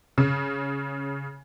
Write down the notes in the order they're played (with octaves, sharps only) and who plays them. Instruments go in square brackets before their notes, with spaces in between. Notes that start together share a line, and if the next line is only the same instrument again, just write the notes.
[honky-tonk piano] C#3